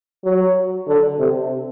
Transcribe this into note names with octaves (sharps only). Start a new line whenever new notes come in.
F#3
D3
C3